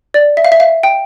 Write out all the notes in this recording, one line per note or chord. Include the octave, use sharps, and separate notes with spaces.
D5
E5
F5
E5
F5
G5